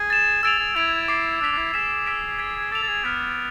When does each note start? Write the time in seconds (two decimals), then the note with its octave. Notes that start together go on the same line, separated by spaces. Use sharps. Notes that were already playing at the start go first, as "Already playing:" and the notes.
Already playing: G#4
0.10 A6 E7
0.43 G#4 E6 A6 D7 F7
0.60 G#4
0.76 E4 G#6 D7 F7
1.08 D6 A6 C7
1.41 D4 E6
1.44 B6 F7
1.53 D4
1.58 E4
1.74 G#4 E6 B6 E7
2.06 E6 B6 D7
2.39 G#6 B6 D7
2.72 A4 D6 A6 D7 F7
2.83 A4
2.88 G#4
3.04 B3 F6 B6 D7